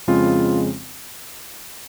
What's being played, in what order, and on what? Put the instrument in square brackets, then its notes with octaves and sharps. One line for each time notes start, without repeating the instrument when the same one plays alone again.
[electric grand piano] F2 C#3 G#3 C4 F4